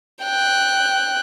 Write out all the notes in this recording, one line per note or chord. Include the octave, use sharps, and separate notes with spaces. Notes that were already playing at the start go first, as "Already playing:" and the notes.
G5 F#6